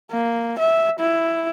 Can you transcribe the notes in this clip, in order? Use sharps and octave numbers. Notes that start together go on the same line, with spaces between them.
A#3
E5
E4